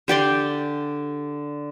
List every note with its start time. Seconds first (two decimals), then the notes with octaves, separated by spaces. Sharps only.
0.08 D3 G4 D5 C6